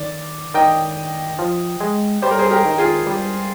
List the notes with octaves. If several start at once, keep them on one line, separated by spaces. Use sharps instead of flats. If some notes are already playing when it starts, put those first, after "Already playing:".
Already playing: D#3 D5
D#3 D#5 G5
F3
G#3
G3 C5
A#4
G#4 C5
G4 A#4
D#3
F4 G#4
G3